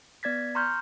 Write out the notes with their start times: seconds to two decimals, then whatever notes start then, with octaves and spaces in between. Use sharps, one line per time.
0.23 B3 D5 G#6 A6 B6
0.55 A#5 C6 C#6 F6 G6